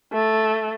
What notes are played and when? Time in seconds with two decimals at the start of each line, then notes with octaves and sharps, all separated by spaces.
0.12 A3